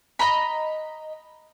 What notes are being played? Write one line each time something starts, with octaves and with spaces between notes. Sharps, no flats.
D#5 A#5 B5